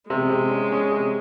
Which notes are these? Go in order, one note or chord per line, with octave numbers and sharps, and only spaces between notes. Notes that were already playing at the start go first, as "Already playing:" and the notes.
C3 G#3
C3
C#4
C#4
C3